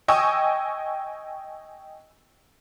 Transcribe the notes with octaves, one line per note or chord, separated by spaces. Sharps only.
D#5 G5 G#5 C#6 D#6 E6